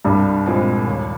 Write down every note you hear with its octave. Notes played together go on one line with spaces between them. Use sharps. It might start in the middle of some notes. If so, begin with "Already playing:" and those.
C2 G2
A#2 F3 G#3 C4
D#2